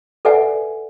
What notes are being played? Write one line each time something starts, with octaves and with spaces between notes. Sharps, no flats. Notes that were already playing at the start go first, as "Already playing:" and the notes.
A4 B4 D5 E5 F#5 G#5